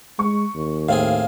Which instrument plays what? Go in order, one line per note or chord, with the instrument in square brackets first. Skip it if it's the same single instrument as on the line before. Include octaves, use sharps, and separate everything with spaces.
[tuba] G#3 [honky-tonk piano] C#6
[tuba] D#2
[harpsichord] A2 C4 G#4 [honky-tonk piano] F5